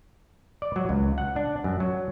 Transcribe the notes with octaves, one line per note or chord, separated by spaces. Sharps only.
D5
F#3
C#2
F#5
D4
F#2
F#3